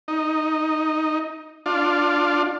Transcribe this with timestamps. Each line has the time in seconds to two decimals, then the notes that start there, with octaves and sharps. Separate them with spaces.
0.08 D#4
1.66 D4 F4